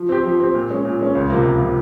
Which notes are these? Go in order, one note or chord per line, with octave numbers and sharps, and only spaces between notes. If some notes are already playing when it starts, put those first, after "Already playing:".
Already playing: F3
C4 G4
F3
C4 G4
A#2
G#3 C#4
A#2
G#3 C#4
C#2
C3 F3 A#3
C#2
C3 F3 A#3